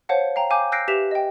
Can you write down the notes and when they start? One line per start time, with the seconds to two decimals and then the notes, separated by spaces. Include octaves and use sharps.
0.09 C5 C#5 F5 F#5 A5
0.36 F5 G5 A#5
0.50 F5 G#5 D6 G6
0.72 E6 F#6 G6 A#6 C7 D7
0.88 G4 B4 E5 B6 E7 F7
1.11 D#5 G5